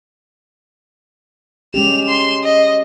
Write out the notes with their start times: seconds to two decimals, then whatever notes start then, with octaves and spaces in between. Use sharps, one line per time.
1.74 G#3 C#4 G4 E7 F7
2.05 C6 E7
2.44 D#5